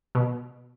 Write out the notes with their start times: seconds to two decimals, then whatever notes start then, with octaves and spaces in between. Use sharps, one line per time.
0.15 B2